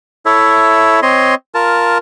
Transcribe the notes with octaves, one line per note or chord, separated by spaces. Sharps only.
E4 A4 C#5 E5
C4 C#5 D#5 C6
F4 A#4 A5